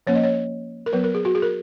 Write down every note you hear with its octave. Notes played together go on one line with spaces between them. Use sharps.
F3 A#3 C#4 C#5
D#5
C#5
A#4
F#3 B3 B4
A#4
G#4
F#4
G#4
A#4